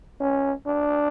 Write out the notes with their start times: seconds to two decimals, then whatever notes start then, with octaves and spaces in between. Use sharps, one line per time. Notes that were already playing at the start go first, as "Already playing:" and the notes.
0.20 C#4
0.66 D4